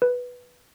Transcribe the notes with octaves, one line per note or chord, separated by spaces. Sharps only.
B4